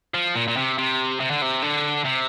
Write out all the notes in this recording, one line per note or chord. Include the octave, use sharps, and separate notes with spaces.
F3
A#2
A#2
C3
C3
C3
D3
C3
D3
C3